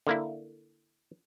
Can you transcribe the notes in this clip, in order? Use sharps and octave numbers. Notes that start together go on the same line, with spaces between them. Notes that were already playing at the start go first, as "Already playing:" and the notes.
D3 A#3 E4